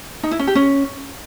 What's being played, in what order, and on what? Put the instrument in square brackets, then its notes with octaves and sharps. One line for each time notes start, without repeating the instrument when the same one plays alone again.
[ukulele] D#4
E4
C#4
G4
C#4